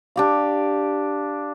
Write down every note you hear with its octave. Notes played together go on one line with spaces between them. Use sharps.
D4 G4 F5